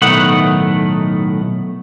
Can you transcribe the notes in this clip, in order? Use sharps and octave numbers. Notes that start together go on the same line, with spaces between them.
B1 A2 D#3 A3 F#5